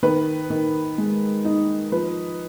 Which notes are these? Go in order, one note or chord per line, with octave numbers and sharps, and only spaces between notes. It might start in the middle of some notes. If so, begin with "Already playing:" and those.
D#3 B4
D#3
G#3
D#4
F3 B4